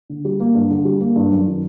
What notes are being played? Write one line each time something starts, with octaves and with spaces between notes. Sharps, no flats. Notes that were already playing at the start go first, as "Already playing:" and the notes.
D3
G3
A#3
G2
D3
G3
A#3
G2
F#2
D#3